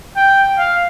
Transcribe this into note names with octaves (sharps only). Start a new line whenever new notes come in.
G5
F5